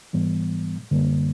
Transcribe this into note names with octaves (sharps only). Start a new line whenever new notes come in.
G#2 E3 G3 B3
F#2 D3 G3 A#3